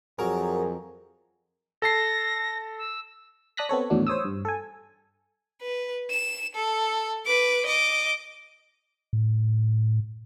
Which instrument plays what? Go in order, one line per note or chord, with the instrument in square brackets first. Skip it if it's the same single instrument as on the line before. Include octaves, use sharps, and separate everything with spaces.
[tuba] F2 [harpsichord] F#3 [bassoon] G#4 [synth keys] A#4
[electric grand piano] A4 A5 C7 [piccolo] A#6
[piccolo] E6
[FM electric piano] D5 A5 D#6 F#6 A#6 B6
B3 C4 A4 C#5
E2 A2 D#3 F#3 D4
C5 C#5 D#6 E6
G2
A4 G#5
[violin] B4
E7
A4
B4 D6
D#5 D6
[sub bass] A2